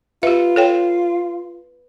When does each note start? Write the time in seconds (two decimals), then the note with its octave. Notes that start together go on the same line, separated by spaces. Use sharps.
0.23 F4 G4 B4 E5
0.56 A4 C#5 G5